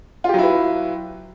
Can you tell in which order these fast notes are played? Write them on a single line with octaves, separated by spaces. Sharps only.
F4 G4 F#3 E4 B4